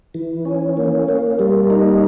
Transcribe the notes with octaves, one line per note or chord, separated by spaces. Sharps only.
E3
C#4
A#3
A#3
G3
D#4